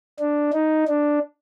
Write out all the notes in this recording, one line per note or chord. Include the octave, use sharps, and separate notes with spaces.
D4
D#4
D4